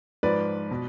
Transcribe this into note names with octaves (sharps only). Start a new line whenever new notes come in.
G#2 F3 B4 D5
B2